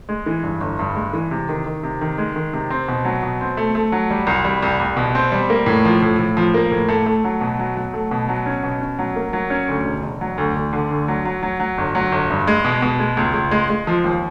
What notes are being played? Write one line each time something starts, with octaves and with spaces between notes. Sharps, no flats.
G#3
E3
G2
G1
G2
G#3
E3
C3
D#3
D#3
C3
D#3
G#3
D#3
C3
C4
B2
F#3
B2
C4
A3
A3
F#3
G3
C2
G3
C2
C2
B2
C4
G3
A#3
A2
F3
A2
A2
F3
A#3
A2
A3
A3
F#3
B2
F#3
F#3
A3
B2
F#3
C#4
B2
C#4
F#3
A#3
F#3
C#4
D2
E1
E1
F#3
D2
D2
D3
D2
F#3
F#3
F#3
F#3
G1
F#3
G1
G2
G#3
B2
B2
G#3
C#2
C#2
G#3
G#3
F3
D#2